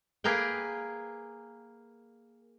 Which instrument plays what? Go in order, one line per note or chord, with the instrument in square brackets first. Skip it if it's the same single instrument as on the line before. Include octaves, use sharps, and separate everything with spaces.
[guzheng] A#3 G#4 A#4 B4 G5